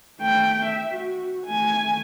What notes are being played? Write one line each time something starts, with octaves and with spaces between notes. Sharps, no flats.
A3 G5
E5
F#4
A3 G#5